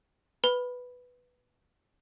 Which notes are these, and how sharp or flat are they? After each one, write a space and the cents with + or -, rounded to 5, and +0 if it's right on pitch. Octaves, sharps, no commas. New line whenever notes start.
B4 +5 B5 +0